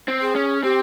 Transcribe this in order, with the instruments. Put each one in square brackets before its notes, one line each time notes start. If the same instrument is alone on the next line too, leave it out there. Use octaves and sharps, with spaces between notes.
[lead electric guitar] C4
[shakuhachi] G#4
[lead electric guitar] C#4
[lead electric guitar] C4 [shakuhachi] G4